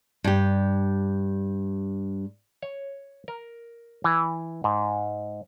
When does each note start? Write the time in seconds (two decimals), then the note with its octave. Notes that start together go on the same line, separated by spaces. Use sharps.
0.24 G2 G4
2.62 C#5
3.28 A#4
4.04 E3
4.64 G#2